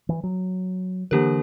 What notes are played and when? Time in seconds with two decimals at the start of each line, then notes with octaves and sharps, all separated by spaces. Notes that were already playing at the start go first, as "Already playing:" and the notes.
0.09 E3
0.23 F#3
1.11 D3 E3 A#3 D4 G4 A#4